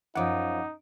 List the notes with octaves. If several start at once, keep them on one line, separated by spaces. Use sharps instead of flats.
F#2 F3 D#4 F#5 D6